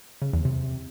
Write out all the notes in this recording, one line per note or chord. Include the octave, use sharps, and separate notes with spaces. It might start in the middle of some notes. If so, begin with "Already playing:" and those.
C#3
E2
C3